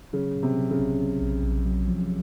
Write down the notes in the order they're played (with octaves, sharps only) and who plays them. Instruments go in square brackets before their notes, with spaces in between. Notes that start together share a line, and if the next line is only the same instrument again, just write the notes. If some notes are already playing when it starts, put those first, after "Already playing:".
[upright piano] C#3 [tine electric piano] F#3
[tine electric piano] A#2
[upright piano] C3
[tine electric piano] F#3
[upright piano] C#3
[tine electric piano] A#1
F#3
A#1
A#1
F#3
F3